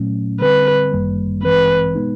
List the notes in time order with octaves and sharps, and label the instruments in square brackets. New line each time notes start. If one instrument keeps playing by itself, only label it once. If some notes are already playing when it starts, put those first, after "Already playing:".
Already playing: [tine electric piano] A#2 F#3 A3 C#4
[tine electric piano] D3 G3 C4 [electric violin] B4
[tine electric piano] G1 F#2 D#3 G3 A#3
[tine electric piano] A1 G2 E3 G#3 C4 [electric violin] B4
[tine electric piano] B2 G#3 B3 D#4